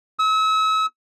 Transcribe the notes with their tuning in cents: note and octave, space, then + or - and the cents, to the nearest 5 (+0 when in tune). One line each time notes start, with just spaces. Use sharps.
E6 -40